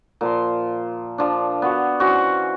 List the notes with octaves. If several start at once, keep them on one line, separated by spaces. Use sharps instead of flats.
A#2 F3 C6
F3 D4
B3 F#4
E3 C#4 F#4 C5